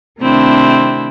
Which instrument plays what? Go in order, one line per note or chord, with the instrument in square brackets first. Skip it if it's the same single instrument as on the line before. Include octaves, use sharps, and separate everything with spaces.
[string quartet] C3 D#3 A3 C4 D4 E4